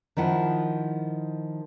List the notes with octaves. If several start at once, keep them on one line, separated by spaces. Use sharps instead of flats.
D#3 F3 E4 F#5